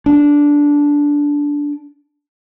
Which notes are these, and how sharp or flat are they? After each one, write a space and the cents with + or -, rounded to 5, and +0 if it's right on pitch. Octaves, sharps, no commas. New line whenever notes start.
D4 -10